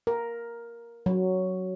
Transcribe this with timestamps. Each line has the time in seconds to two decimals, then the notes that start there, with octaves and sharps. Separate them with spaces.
0.07 A#4
1.06 F#3